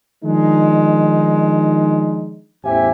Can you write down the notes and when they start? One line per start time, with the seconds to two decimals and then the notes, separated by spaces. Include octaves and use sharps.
0.23 D#3 F3 G#3 D4 D#4
2.63 A1 E2 G4 C5 E5 G#5